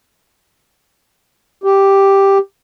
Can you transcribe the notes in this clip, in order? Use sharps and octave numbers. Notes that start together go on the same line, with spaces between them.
G4